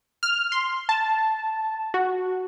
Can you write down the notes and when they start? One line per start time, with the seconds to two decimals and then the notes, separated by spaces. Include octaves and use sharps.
0.23 F6
0.52 C6
0.89 A5
1.94 F#4